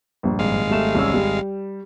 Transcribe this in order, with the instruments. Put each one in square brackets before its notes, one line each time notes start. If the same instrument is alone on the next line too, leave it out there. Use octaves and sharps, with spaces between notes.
[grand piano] A#1 G2
[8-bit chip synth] G#1 G#3 F5
[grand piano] G3 A3 E7
C2 C#4 E6
G3